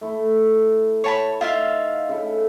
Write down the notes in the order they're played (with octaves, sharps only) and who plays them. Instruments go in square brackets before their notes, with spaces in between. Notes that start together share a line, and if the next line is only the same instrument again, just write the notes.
[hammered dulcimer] A3 E4
[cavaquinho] C#5 A5 B5
[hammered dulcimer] D#4 [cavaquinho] F4 E5 F5
[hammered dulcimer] C#3 E4 A4